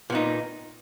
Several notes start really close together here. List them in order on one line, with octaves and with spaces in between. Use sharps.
A#2 B3 D#4